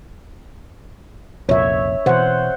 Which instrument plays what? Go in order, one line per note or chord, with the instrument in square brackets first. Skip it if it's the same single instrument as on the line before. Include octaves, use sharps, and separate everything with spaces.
[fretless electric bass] C2 F2 A#2 [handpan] C#5 E5
[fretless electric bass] B2 E3 [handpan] C5 F#5